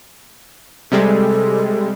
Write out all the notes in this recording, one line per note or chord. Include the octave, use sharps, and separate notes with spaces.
C3 G3 G#3 A4